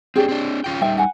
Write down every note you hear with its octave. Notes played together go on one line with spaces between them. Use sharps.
C4 D4 G4 G#4
C4 D4
C#4 F4 G5
G3 D#4 E5 G5
F#5 G#5